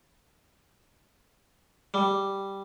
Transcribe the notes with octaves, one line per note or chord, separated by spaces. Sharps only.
G3